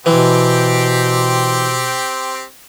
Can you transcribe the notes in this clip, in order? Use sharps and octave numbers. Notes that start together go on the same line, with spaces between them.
B2 E3 C4 G4